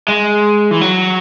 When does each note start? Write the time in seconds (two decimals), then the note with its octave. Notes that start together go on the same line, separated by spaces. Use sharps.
0.08 G#3
0.71 E3
0.81 F#3